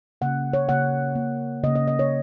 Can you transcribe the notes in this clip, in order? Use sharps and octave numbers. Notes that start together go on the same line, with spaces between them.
C#3 A#3 F#5
C#5
C#3 A#3 F#5
C#3 A#3
C#3 A#3 D#5
D#5
D#5
C#5